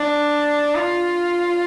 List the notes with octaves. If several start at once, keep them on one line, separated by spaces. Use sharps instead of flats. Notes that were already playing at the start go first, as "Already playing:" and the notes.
Already playing: D4
F4